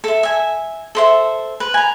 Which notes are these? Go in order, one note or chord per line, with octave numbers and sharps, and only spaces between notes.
A4 E5
E5 G#5
A4 C5 E5
B4
G#5 A#5